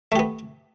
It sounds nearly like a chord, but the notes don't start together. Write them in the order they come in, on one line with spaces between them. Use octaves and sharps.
A3 G4 B3